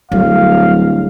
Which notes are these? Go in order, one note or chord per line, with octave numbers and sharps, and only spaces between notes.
D1 F#3 G3 F5